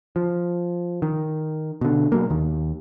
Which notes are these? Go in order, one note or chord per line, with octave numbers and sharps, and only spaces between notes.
F3
D#3
B2 D3
B2 F#3 A#3
D#2 D#3